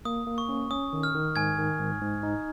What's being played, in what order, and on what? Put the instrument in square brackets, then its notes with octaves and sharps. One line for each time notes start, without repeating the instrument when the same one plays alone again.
[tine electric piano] A#3 [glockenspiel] D#6
[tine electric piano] A#3
[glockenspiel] C#6
[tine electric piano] C#4
[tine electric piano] C#4 [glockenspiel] D#6
[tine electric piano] D#3
[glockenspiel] F6
[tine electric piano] D#3
[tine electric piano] G#2 [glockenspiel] G#5 G#6
[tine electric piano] D#3
G#2
G#2
D#4